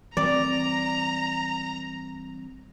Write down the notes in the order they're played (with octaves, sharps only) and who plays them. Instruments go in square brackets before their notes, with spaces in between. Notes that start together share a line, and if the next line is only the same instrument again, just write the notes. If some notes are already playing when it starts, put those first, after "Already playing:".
[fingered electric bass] E3 G3 C4 [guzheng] D5 [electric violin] A#5